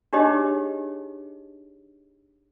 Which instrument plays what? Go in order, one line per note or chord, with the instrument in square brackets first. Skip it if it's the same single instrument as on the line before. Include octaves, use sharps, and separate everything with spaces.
[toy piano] D4 D#4 G4 G#4 C#5 D#5